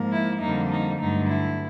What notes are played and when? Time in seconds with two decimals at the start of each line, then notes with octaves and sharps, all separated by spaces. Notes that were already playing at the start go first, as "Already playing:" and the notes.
Already playing: G#2 F3 A#3
0.13 E4
0.41 F2 D3 G3 A#3 D#4
0.71 D#4
1.00 G2 D3 F#3 A3 D#4
1.28 E4